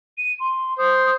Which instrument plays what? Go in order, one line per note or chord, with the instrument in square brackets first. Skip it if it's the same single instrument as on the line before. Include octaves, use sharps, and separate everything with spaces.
[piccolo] D#7
C6
[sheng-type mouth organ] C5 [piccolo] D#6